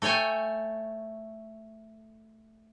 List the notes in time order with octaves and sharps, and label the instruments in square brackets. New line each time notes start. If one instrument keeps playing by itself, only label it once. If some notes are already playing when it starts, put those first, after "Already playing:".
[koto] A3 A4 C#5 G5 G#5